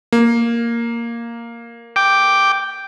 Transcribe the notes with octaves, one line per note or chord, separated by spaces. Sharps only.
A#3
G5 D6